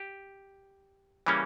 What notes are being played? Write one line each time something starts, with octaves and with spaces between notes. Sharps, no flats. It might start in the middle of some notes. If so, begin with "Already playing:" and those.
Already playing: G4
C#3 E3 G3 A#3 C#4